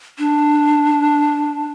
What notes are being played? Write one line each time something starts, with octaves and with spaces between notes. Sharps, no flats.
D4